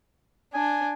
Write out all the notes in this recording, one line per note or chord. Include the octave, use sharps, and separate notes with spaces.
D4 G#5